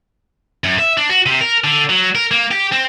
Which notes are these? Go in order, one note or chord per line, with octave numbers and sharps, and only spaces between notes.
F#2
E5
D4
F#4
C3
A#4
D3
F#3
A#4
A#3
G4
C4